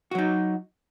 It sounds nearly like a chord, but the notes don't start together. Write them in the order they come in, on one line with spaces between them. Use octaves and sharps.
F#4 F#3 D#4